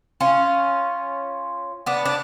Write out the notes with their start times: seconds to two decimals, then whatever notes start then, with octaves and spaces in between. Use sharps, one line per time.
0.20 C#4 F4
1.86 B3 D4
2.05 D4